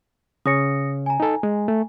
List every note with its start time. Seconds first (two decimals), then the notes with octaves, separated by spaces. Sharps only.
0.46 C#3 C#4 D#6 A#6 C#7
1.06 G#5 A#5
1.20 D#4 A4
1.43 G#3
1.68 A3